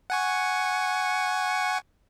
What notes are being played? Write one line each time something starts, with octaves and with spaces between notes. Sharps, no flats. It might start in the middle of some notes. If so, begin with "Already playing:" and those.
F#5 G#5 C#6